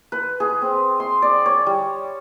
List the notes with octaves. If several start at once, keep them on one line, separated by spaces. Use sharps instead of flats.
B4
G#4
C4
C6
D5
C#5
G3